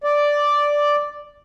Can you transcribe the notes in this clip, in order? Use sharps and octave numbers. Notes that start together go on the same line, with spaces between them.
D5